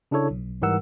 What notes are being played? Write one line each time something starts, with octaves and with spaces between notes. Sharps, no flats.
C#3 D4 E4 A4 C#5
B1
G#2 E3 G3 A#4 F#5 E6